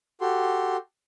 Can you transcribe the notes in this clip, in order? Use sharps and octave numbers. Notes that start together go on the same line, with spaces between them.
F#4 G4 A4 C6